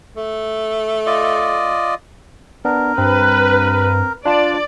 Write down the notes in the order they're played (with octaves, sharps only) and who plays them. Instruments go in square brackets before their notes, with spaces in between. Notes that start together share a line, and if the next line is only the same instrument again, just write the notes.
[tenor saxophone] A3
[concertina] F4 D5 D#5
[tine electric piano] B3 D4 [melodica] A#4
[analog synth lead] G2 [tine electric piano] C4 [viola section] B4
[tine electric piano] D4 F4 A5 [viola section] D5